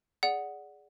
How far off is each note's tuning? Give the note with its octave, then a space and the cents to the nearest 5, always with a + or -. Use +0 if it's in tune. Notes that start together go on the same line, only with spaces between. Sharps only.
G#4 +0 D5 -10 F#5 +0